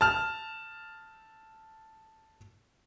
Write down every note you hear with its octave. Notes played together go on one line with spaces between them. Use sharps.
A5 F6